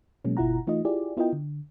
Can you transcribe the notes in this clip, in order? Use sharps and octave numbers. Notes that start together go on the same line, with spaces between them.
B2 F#3 G#3 A#3 C#4
G1 B2 E4 F4 F#5 A#5
E3 A3 D#4 F4 D#5
E4 F4 G4 G#4 D5
B3 E4 F4 A#4 D#5 G5
D3